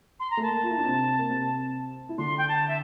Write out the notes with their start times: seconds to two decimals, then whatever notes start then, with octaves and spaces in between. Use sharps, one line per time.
0.19 C6
0.30 A#5
0.37 A3
0.41 A#3 A5
0.63 F4
0.70 E4
0.78 D4
0.86 C3 C4
1.19 A#3
1.29 C3 C4
2.09 E4
2.18 D3 D4 C6
2.37 G5
2.48 A5
2.68 E5